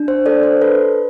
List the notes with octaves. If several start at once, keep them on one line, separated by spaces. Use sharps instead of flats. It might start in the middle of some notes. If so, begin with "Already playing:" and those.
Already playing: D4
C5
A4 D5
C5
A4 B4